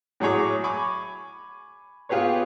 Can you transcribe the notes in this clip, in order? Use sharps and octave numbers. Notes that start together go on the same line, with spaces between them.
A2 F#3 F#4 G#4 C#5 D6
G#5 B5 C#6 D6
B3 F4 G4 G#4 B4 C#5